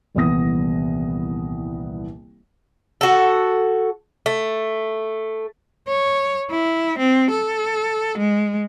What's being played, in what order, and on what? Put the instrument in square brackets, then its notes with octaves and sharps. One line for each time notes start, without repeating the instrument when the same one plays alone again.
[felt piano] D#1 C2 E3 B3 D#6 A#6
[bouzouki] F#4 A4
A3
[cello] C#5
E4
C4
A4
G#3